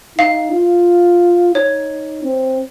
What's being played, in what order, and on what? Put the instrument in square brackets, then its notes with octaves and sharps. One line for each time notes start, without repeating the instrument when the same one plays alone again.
[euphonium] D#4 [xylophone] F5
[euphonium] F4
[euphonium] D#4 [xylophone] C#5
[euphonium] C4